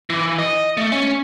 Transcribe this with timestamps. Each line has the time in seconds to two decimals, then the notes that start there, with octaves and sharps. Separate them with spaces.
0.10 E3
0.38 D#5
0.77 A3
0.92 C#4